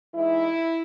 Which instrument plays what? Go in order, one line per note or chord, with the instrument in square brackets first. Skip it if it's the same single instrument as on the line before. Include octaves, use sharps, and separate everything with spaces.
[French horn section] E3 G#3 D#4 E4